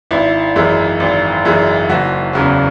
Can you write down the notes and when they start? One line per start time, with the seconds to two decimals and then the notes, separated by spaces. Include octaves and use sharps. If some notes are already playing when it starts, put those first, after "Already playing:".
0.11 G#1 E4
0.56 F#2 E3 G#3
1.00 G#1
1.45 F#2 E3 G#3
1.89 F#1 F#4
2.33 E2 C#3 F#3